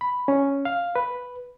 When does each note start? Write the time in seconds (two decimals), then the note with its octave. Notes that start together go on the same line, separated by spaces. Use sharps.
0.01 B5
0.28 C#4
0.65 F5
0.96 B4